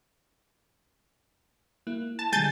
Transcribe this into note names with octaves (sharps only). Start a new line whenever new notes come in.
A#3 E4 F#6
A5
D3 G3 G#3 G#5 G6 A6